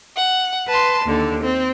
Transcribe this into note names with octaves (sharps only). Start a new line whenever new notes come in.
F#5
B4 A5 C6
D#2 D3
C4